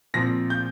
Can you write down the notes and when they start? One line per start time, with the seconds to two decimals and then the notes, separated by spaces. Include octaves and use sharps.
0.14 A#2 F3 C4 A#6
0.50 G6